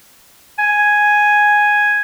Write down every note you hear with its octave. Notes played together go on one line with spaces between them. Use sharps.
G#5